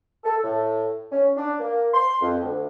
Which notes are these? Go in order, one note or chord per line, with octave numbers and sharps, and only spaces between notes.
A4
A2
C#4
D4
A#3
C6
F2
D2